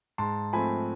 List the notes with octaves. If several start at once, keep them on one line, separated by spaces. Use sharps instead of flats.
G#2 A5 C6
F3 A3 C4 G#5 B5